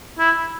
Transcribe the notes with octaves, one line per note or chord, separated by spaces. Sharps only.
E4